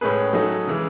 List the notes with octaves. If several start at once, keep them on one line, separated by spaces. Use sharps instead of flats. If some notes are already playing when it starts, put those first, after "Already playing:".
A2 G#3 C#4 G#4 B4
F#3 A3 D#4 G#4
C#3 E3 G#3